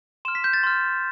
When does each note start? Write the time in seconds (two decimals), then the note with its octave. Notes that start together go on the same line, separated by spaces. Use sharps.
0.25 C6 F6 E7
0.35 B6
0.44 G6
0.53 A6
0.63 C6 F6